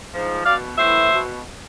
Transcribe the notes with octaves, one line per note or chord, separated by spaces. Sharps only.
G#2 F3
B2 D5 F5
A2 E3 C5 E5
B2